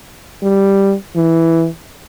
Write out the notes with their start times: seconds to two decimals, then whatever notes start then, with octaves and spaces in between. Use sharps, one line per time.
0.43 G3
1.16 E3